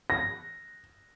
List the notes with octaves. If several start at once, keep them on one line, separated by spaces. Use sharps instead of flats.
A#6